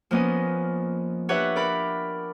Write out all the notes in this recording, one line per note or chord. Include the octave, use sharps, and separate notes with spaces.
F3 A#3 B3 C#4 D#5
D4 G4 B4 C#5 E5 F#5
A#4 D5 B5